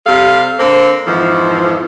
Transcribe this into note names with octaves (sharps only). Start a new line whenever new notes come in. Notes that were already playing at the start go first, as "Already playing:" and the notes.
C3 G3 A4 F5
D3 A#3 C4
F2 G#2 E3 F3